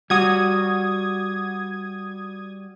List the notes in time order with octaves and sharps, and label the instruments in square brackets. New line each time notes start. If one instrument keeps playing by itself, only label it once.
[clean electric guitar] G3 F#4 [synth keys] D#6 G#6